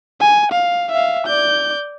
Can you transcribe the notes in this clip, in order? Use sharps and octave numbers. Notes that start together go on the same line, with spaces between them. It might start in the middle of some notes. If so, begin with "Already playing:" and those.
G#5
F5
E5 F5
D5 G6